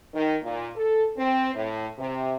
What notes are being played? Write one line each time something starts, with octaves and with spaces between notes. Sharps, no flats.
D#3
A#2
A4
C4
A2
C3